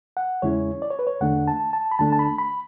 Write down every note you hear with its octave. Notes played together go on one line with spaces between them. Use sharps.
F#5
E2 C#3 G#3 C#4 E4 C#5
D5
C#5
B4
C#5
E2 D3 A3 D4 F#5
A5
A5
B5
D2 D3 A3 D4 A5
A5
B5
B5